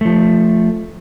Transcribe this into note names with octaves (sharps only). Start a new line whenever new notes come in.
F3 A3